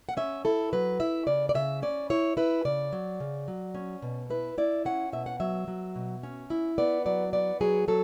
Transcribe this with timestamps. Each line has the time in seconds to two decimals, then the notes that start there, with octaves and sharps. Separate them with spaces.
0.09 F#5
0.17 C#4 E5
0.45 E4 A4
0.73 F#3 B4
1.00 E4 E5
1.27 C#3 D5
1.49 D5
1.55 C#3 E5
1.82 C#4 D5
2.10 E4 C#5
2.37 E4 B4
2.65 C#3 D5
2.92 F#3
3.20 C#3
3.48 F#3
3.75 C#4
4.02 B2
4.30 E4 B4
4.58 E4 D5
4.85 C#4 F#5
5.12 B2 E5
5.26 F#5
5.40 F#3 E5
5.68 F#3
5.96 B2
6.23 C#4
6.50 E4
6.78 B3 D5
7.06 F#3 D5
7.33 B3 D5
7.61 F#3 G#4
7.88 F#3 A4